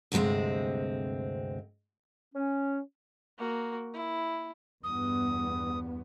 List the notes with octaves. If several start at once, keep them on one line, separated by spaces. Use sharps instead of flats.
D2 G2 C3 G#3 C4
C#4
A#3 F#4
E4
E2 G2 B3 D#6